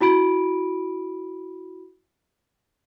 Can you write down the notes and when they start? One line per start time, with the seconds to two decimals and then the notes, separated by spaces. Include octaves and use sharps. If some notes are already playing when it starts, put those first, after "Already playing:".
0.01 E4 F#4 B5 D7